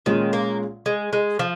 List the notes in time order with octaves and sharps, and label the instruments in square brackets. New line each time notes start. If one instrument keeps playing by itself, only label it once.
[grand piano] A#2 G#3 C#4 F4 [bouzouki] D#3
[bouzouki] A#3
G#3
G#3
F3